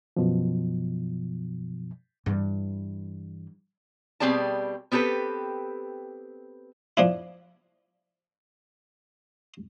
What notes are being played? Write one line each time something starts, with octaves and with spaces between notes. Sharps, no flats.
F#2 B2 F3
G2 E3
B2 G3 C4 G#4 D5 A5
B3 C4 G4 A4 B4
F3 D4 E4